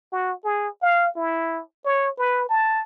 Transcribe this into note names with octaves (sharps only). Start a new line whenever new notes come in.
F#4
G#4
F5
E4
C#5
B4
A5